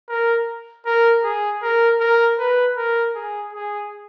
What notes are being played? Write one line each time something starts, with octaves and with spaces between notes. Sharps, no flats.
A#4
A#4
G#4
A#4
A#4
B4
A#4
G#4
G#4